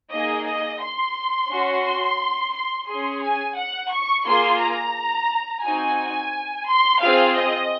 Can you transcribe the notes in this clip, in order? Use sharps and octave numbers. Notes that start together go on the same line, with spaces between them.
A#3 D#4 G#4 D#5
D#5
C6
C#4 F#4
C6
C6
C#4 G#4 C6
G#5
F#5
C#6
A#3 F4 G#4 C6
A#5
C4 D#4 F#4 G#5
C6
C4 F4 G#4 F5
D#5